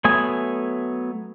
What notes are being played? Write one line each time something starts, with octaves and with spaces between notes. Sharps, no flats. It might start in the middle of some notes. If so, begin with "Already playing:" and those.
F#3 A3 B3 G#5 D#6